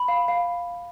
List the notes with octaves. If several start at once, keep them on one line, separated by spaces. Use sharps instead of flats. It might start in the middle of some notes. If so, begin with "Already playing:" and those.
Already playing: B5
F5
F5